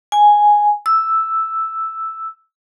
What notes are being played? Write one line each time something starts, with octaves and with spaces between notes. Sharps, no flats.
G#5
E6